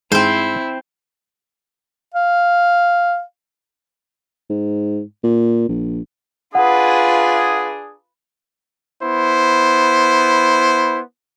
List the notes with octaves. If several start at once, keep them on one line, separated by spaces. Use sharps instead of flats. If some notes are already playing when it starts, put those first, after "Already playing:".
G#2 C4 E4 C5
F5
G#2
A#2
A#1
D4 F4 G#4 B4 F#5
B3 E4 C5